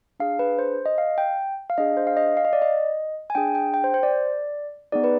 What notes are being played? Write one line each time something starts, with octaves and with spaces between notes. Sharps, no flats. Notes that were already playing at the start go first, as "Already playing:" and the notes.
D4 G#4 F5
B4
C5
D#5
F5
G5
F5
D4 G#4 D#5
C5
F5
D#5
F5
D#5
D5
D#5
G#5
D4 G#4 G5
G5
G5
C5
C5
D5
B3 D#4 G#4 D5
B4